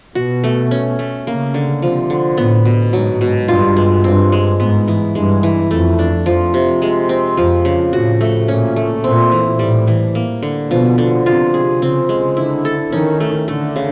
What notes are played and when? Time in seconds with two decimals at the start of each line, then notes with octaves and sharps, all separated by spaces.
0.15 B2 F#4
0.44 A3
0.71 C#4
0.99 A3
1.27 C#3 A#3
1.54 D3
1.82 C3 F3
2.10 D3
2.37 A2 B3
2.65 B2
2.93 G#2 F#3
3.21 B2
3.48 G2 F4
3.77 G#3
4.04 G2 C4
4.32 G#3
4.60 G#2 B3
4.88 E3
5.15 G2 G#3
5.43 E3
5.71 F2 A3
5.99 D4
6.26 F2 F3
6.54 C3
6.82 G#3
7.09 C4
7.37 F2 F3
7.65 C#3
7.93 A2 F#4
8.21 A3
8.48 A#2 C#4
8.76 A3
9.04 A#2 C4
9.32 E3
9.59 A2 G3
9.88 E3
10.15 A#3
10.43 D3
10.70 B2 F3
10.98 D3
11.26 C3 F4
11.54 G#4
11.81 C#3 C4
12.09 G#3
12.37 D3 E4
12.65 A4
12.92 D#3 C#4
13.20 A3
13.48 D3 A3
13.76 C#3